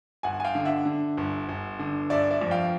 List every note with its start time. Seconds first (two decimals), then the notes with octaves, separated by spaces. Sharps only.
0.23 G1 F#5 G#5
0.40 G#5
0.44 F5 G5
0.55 D3
0.65 E5 F#5
0.85 D3
1.17 G1
1.49 G1
1.79 D3
2.10 G1 D5 E5
2.31 D5 E5
2.41 F2
2.51 F5 G5